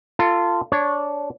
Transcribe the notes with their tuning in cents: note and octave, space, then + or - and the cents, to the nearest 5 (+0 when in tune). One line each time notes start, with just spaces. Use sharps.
F4 -15 A4 +20
D4 -15 C#5 +0